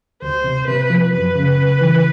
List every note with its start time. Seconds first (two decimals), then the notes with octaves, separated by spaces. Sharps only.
0.22 D2 C5
0.44 C3
0.67 C3 B4
0.90 F3
1.13 F#2 B4
1.35 C#3
1.59 C#3
1.81 E3